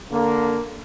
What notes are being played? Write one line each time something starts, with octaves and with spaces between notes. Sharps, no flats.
D3 A#3